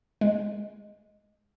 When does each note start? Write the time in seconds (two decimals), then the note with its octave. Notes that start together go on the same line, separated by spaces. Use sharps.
0.21 G#3